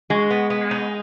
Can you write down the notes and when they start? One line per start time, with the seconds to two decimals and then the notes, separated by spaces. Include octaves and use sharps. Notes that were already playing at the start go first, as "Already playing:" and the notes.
0.10 G#3 F#4
0.30 B3
0.50 B3
0.71 D#4